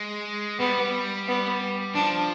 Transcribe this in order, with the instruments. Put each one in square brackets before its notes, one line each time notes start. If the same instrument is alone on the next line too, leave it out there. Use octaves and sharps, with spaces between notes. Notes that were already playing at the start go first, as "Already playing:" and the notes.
Already playing: [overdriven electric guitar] G#3
[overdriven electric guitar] G3 [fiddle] B3
[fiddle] B3
[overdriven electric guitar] F3 [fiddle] D4